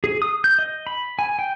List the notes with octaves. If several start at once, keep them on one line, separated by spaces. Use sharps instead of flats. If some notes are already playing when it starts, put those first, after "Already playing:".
G#4
D#6
G6
D#5
B5
G#5
G5